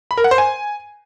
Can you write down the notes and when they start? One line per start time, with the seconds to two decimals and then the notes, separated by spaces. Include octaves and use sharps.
0.11 B5
0.18 A#4
0.24 F#5
0.31 C5
0.38 G#5